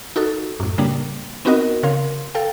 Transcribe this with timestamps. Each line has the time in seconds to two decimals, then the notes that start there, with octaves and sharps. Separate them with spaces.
0.16 D#4 F#4 A4
0.60 F#2 A2
0.78 C#3 G3 A#3 D4
1.45 B3 C4 D#4 F#4 A#4 D#5
1.83 C#3 A#4 F5 C6
2.35 A4 F5 G5